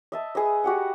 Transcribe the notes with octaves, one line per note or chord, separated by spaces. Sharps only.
D#5 E5 A5
G#4 B4 D#5
F#4 G4 F#5